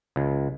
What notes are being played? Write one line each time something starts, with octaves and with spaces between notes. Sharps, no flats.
C#2